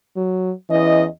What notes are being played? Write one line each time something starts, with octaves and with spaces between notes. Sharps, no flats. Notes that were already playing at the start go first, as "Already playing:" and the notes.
F#3
E2 E3 C#4 D#5